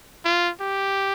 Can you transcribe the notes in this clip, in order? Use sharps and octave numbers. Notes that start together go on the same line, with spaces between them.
F4
G4